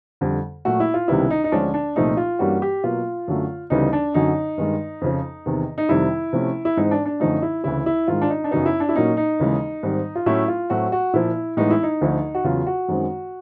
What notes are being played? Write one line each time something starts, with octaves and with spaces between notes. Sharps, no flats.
F2 D3 G3
A#2 F#3 A3 F#4
E4
F4
C#2 C3 D#3 G3 B3 E4
D#4
D#4
D2 D3 F3 G#3 C#4 D4
D4
C2 A#2 F3 A3 D#4
F4
G2 E3 G3 A#3 C#4 F#4
G4
B2 F#3 A#3 F4
F#2 D3 F#3 A3
D2 C#3 E3 G3 B3 D#4
D4
F#2 D3 F#3 D#4
G2 D#3 G#3
F2 C#3 F3
E2 C3 D#3
D#4
F2 C3 D#3 G3 E4
C3 F3 A3 C#4
E4
G#2 E3 G#3 C4 D#4
D4
D4
F#2 D3 F3 A3 D#4
E4
D2 C#3 E3 E4
E4
G#2 D#3 G#3 F4
D4
D#4
D4
F#2 C#3 F#3 B3 D#4
E4
D4
E4
A#2 F#3 A#3 C#4 D#4
D#4
D#2 C#3 E3 G#3
G#2 D#3 G3 C4
F4
A2 F#3 A3 C#4 E4
F4
A2 F#3 A3 C4 F#4
F#4
A#2 F3 A#3 E4
A2 E3 G#3 B3 D#4
E4
D#4
D2 D3 F3 A3
F#4
E2 C#3 F#3 F4
F#4
F#2 D#3 G#3 C4